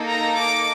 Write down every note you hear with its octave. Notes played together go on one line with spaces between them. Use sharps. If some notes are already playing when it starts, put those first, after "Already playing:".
Already playing: A#3 D#4 A4
A#5
D6